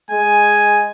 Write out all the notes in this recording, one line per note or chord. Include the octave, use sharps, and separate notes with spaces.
G#3 G#5